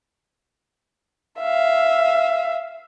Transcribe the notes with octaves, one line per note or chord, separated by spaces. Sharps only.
E5 F5